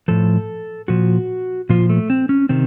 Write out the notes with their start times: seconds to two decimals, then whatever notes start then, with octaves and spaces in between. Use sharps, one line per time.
0.08 A2 F3 A4
0.88 A#2 F3 F#4
1.69 A#2 F3 F4
1.90 A3
2.10 C4
2.29 C#4
2.49 C3 D#3 C4